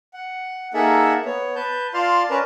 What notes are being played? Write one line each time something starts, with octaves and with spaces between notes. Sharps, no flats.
F#5
A#3 D#4 G#4 A4 E5 F#5
B3 C#5
B4 A5 G6
F4 D5 F5 A5 C6 F6
C#4 A#4 B4 D5 A5 A#5